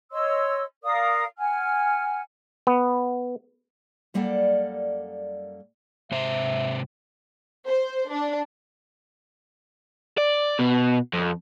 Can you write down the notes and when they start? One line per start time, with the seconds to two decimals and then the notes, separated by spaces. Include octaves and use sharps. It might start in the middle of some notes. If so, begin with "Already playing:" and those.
0.12 C#5 D#5 C6 E6
0.84 A#4 D5 F5 D#6
1.38 F#5 G#5 F6
2.67 B3
4.14 F#2 G3 A#3 A4 D5 F#5
6.12 G#2 C3 C5 E5
7.66 C5
8.11 D4
10.18 D5
10.59 B2
11.13 F2